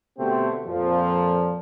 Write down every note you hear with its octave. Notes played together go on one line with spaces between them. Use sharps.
B2 D3 A3 C4 G4
F2 A#2 F3